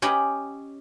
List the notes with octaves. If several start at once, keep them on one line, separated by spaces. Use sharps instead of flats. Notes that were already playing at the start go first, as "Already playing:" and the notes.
C#4 G4 D#5 G5 B5